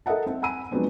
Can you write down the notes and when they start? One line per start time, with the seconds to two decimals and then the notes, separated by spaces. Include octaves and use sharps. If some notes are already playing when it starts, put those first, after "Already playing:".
0.06 A4 A#4 D#5 E5 F#5 A5
0.26 C4
0.42 F#5 G#5 B5 E6 D#7
0.71 F3 F#3 G#3 B3 C4 D4